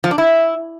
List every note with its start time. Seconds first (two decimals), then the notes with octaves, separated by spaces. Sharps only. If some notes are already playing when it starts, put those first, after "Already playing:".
0.04 F3
0.11 D4
0.18 E4